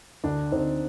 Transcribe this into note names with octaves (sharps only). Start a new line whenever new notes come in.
D2 D4
D2 C4 D#4